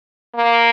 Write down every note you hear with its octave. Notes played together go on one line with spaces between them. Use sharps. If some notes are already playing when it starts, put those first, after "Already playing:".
A#3